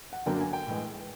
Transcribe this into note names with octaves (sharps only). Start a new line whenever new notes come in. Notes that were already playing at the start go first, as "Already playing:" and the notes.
F#5
F#2 D3 F#3 A#3 D4 G5
G#5
G5
A2 E3 G#3